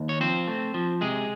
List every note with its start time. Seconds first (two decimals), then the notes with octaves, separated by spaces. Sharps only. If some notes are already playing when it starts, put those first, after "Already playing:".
Already playing: D#2
0.09 C#5
0.20 F3 C4 C5
0.48 A3
0.74 F3
1.01 C3 G#3 G#4